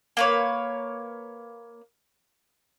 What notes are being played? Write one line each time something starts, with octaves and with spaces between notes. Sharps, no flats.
A#3 B4 C#5